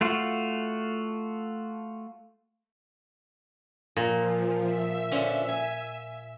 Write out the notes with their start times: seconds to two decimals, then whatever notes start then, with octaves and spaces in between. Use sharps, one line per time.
0.01 A3 F4 F#4
3.97 A#2 F3
4.62 E5
5.12 D3 F3 C#4
5.49 G#5